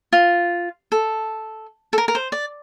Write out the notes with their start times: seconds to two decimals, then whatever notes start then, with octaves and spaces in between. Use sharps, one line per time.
0.13 F4
0.92 A4
1.93 A4
1.98 A#4
2.08 A#4
2.15 C5
2.32 D5